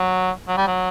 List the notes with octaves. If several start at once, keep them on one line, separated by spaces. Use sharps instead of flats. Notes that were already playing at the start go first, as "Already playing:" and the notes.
Already playing: F#3
F#3
G3
F#3